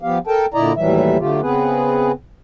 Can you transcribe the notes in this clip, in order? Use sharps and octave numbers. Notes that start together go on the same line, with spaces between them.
F3 B3 G4 F5
A4 A#4 G5 A5
A#2 D3 E4 D5 D#5 A#5
D#2 A2 E3 F#3 G3 E5
D3 F#3 A3 F4 G4
C#3 B3 C4 G#4 B4